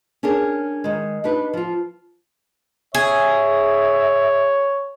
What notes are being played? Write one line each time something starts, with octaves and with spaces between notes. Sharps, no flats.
C#4 D4 G#4 A#4 C#5
D#3 G#3
D4 D#4 G4 B4
F3 F4
G#4 C#5 E5